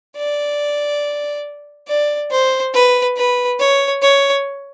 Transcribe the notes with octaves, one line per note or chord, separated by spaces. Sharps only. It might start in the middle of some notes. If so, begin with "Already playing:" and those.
D5
D5
C5
B4
B4
C#5
C#5